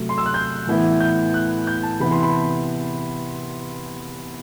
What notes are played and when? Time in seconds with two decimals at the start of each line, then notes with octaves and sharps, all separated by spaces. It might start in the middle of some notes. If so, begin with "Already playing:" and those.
Already playing: C3 F#3 A3
0.09 C6
0.18 E6
0.26 F#6
0.34 G6
0.67 A2 E3 B3 E4
1.00 G6
1.34 F#6
1.67 G6
1.83 A5
2.00 C3 E3 B3 E4 B5
2.11 C6
2.23 B5